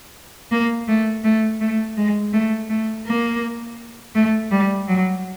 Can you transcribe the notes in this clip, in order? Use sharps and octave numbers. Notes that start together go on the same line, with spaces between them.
A#3
A3
A3
A3
G#3
A3
A3
A#3
A3
G3
F#3